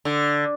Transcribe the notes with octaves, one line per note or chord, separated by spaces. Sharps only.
D3